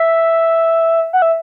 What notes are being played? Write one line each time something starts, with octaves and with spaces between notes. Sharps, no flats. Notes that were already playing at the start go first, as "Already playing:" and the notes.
Already playing: E5
F#5
E5